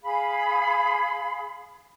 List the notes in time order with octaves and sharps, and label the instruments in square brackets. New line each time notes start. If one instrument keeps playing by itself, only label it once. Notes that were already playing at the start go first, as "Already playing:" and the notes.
[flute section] G#4 F5 B5